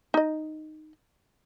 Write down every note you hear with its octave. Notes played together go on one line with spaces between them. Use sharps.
D#4 D#5